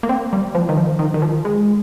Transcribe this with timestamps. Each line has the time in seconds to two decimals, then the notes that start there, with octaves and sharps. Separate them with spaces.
0.03 A#3
0.09 C4
0.33 G3
0.55 F3
0.69 D#3
0.77 F3
0.99 D#3
1.14 D#3
1.22 F3
1.45 G#3